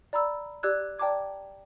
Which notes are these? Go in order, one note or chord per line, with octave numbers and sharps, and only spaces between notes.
D5 A#5 B5 E6
G4 D5 D6 E6 F#6 G#6
D5 G5 A5 A#5 D6 G#6